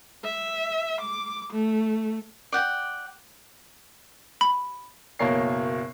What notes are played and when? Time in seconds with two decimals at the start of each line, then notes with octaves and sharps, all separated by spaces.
0.24 E5
1.01 D6
1.52 A3
2.52 D5 F#5 G5
4.41 B5
5.19 F#1 B2 A#3 A#4 C#5 C7